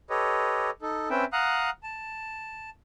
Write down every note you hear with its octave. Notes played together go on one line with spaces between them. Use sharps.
G4 A4 B4 C#5 D#5
D#4 A4
C4 C#4 B4 E5 G5
F5 F#5 A#5 D#6 F#6
A5